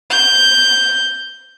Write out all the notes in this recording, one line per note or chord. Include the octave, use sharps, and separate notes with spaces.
G6